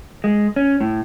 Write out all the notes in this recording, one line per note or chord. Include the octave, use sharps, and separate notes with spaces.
G#3
C#4
A2